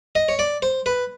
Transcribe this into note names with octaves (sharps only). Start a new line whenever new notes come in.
D#5
C#5
D5
C5
B4